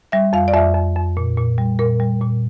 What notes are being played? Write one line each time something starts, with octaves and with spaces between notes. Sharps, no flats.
G3 E5
F2 F5
D5
F2 E5
F2
F2
A#2
A#2
G3
A#2 A#4
G3
A#2